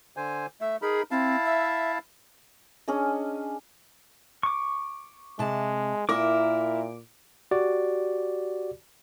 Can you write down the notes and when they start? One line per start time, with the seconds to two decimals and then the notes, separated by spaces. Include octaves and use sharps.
0.17 D3 C5 G#5
0.61 A3 E5
0.82 D#4 G#4 A#4 B5
1.11 C4 E4 F5 A5
1.45 E5
2.88 C#4 D4 G#4 D#5
4.43 C#6 D6
5.39 C3 G#3 A5
6.09 A#2 E4 A#4 D6
7.51 F#4 G4 D5